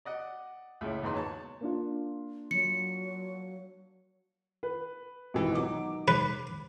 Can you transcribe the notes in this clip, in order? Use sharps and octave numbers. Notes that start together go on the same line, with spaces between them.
D5 D#5 F#5
C#2 A2 E5
A#1 E2 G#2 D#3 B4 C6
C#5 A5 C#6
A#3 D4 F4
F#3 C#7
B4
G#1 G#2 B2 E3
D#3 F#3 D#4 D6
B4